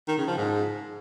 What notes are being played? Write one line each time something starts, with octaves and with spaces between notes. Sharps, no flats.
D#3
C#3
F3
G#2